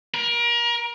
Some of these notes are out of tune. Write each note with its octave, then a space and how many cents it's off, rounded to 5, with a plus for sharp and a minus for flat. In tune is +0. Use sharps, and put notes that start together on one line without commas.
A#4 +30